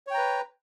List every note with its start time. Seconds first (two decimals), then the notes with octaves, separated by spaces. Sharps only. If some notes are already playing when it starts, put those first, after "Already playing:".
0.07 C#5
0.11 G5
0.14 A#5
0.18 B4